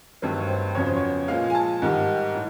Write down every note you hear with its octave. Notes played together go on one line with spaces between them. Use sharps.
G2 D#3 F#3 A3 C4 B4
C#5
C5
F2 C#3 F#3 B3 C#5
C5
C#5
A#2 F3 G#3 F5
G#5
A5
G#2 D#3 G3
A2